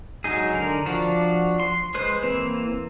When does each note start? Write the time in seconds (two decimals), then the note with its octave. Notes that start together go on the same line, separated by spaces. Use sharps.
0.24 F#3 G#3 D#4 G#4
0.53 D3 A#4
0.86 F3 D4 F#4
1.60 C6
1.94 G#3 B4 C5
2.22 E3 A#3 C4